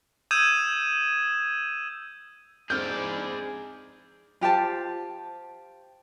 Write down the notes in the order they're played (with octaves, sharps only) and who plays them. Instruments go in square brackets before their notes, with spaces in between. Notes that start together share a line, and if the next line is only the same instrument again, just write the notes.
[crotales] D#6 E6 G6 G#6 D#7 E7
[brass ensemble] G#2 D4 E4 [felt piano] C4 F6 [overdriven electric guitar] G#4 D5 [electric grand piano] G6
[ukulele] F4 G4 C5 A5